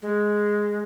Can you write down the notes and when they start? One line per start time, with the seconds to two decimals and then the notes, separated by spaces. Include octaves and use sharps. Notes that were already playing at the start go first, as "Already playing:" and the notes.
0.02 G#3